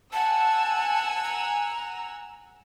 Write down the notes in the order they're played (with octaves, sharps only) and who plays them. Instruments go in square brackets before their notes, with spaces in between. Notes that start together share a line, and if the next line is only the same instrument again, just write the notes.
[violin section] F#5 G#5 E6 [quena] A5
[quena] A#5